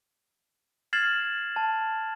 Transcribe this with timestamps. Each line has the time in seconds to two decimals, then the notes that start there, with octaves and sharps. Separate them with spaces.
0.93 F6 G#6 A6 C7 E7 F#7
1.56 A5